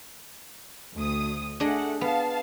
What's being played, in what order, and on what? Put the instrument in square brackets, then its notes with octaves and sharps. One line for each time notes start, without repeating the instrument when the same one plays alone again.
[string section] D2 D#6
[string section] A3 F#5 [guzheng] D4 G#4 D#5
[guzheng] B3 [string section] F5 A5